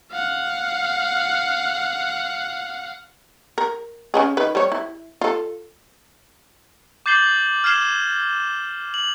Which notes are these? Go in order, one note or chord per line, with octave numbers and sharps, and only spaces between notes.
F5 F#5
A#4
C#3 C#4 G#4
D#3 B4
G3 C#5
E4
F4 A4
D6 G6 A6 C7 F#7 G7
F6 G#6 C7 E7 G7
F#7